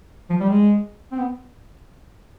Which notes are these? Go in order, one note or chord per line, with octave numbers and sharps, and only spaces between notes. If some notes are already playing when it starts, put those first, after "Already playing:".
F3
G3
G#3
C4
B3